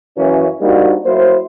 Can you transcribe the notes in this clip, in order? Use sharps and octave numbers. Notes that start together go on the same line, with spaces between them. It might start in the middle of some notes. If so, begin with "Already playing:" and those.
F#2 E3 A#3 C#4
G3 A#3 C4 D4 D#4 F#4
F#3 A#3 E4 C5